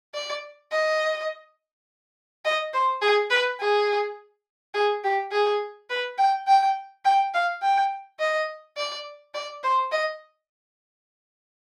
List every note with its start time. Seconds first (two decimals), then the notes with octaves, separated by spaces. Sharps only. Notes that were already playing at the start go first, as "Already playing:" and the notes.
0.14 D5
0.71 D#5
2.45 D#5
2.74 C5
3.02 G#4
3.31 B4
3.60 G#4
4.74 G#4
5.04 G4
5.32 G#4
5.90 B4
6.18 G5
6.48 G5
7.05 G5
7.34 F5
7.62 G5
8.20 D#5
8.77 D5
9.34 D5
9.63 C5
9.92 D#5